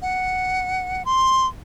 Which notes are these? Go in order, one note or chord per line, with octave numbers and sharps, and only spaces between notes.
F#5
C6